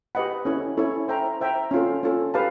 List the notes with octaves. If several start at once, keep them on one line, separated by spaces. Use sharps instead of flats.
G4 B4 D#5 F#5 B5
C#4 E4 A4 C#5
C#4 E4 A4 C#5
C5 E5 G5 A#5
C5 E5 G5 A#5
C#4 F4 A4
C#4 F4 A4
G4 B4 F5 A5